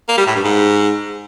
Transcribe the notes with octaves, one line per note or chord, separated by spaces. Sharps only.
A#3
G3
A2
G2
G#2